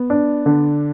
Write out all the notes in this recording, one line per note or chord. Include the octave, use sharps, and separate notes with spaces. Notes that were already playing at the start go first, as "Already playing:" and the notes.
Already playing: B3
D4
D3